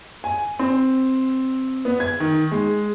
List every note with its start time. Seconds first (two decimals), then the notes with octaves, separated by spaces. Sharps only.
0.24 G#5
0.59 C4
1.85 B3
2.00 G#6
2.20 D#3
2.51 G#3